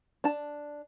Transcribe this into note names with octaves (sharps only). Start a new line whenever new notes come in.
D4 A5